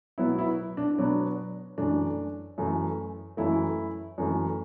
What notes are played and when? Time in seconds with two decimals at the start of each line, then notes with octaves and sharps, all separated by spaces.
0.18 B2 F#3 B3 E4
0.39 E4
0.77 D4
0.97 B2 F#3 B3 D4
1.78 F#2 E3 A3 D4
2.58 F#2 E3 A3
3.37 F#2 E3 A3 E4
4.18 F#2 E3 A3